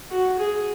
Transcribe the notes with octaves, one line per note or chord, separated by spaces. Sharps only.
F#4
G#4